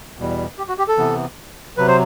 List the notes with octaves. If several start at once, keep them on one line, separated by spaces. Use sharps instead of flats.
E2 B2 G3
G4
F#4
G4
A4
C3 E3 B3
C3 F#3 B4
C5